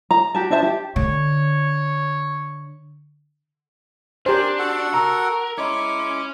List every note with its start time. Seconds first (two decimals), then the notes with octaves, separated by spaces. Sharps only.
0.11 A#5
0.35 F#4 G4 A5
0.50 D4 C5 E5 A5
0.63 G4
0.96 D3 C#5
4.26 D4 G4 A#4 C5 G#5
4.59 F#4 A4 F#5
4.94 A#4 A#5 E6
5.58 G#3 C#4 E4 C#5 D6